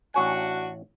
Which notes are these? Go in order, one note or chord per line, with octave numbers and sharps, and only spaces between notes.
A1 D4 F#4 C#5 G#5